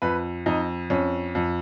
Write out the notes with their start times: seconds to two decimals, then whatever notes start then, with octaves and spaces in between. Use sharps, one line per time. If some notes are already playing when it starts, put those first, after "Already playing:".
0.02 F2 B4
0.46 F2 D#4
0.90 F2 C#4
1.35 F2